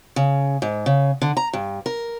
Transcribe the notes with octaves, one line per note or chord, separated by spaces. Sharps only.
C#3
G#2
C#3
D3
A#5
G2
A#4